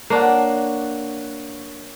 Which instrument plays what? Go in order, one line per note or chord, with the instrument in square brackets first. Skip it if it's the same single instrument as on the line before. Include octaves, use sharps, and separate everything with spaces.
[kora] A#3 D4 [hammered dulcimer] C#5 F#5